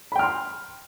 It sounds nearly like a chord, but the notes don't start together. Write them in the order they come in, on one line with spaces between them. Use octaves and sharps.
B5 G5 F6 C6